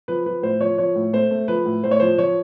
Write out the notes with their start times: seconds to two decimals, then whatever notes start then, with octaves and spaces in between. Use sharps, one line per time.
0.08 F3 B4
0.26 F3 B4
0.43 A2 C5
0.60 F3 C#5
0.78 F3 C#5
0.96 A2
1.13 A3 C5
1.31 A3
1.48 F3 B4
1.66 A2
1.84 A2 C5
1.91 C#5
2.00 F3 C5
2.18 F3 C#5